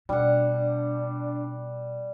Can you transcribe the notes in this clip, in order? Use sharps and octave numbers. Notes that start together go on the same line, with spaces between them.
B2 G3 D4 F#5